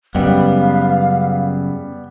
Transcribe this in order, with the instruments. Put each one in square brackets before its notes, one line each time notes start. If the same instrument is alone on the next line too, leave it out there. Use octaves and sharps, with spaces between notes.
[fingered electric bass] F#2 C#3 [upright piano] G3 [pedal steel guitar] B3 [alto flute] F5